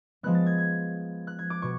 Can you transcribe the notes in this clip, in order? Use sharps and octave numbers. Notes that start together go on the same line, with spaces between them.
F3 G#3 B3 F#6
A6
G#6
G#6
F#6
G#6
D6
B2 C#6